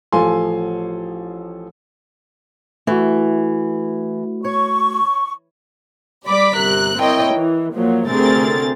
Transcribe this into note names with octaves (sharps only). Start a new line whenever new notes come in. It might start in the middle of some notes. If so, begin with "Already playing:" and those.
A1 F3 A4 F5 G#5 C6
E3 A3 F#4
C#5 C#6
G3 D5 B5 D6 B6
G1 C3 A#4 F#6
C4 E4 A#4 C#5 D#5 G5
E3
A#2 F3 F#3
D2 C3 C4 G#4 A#4 A6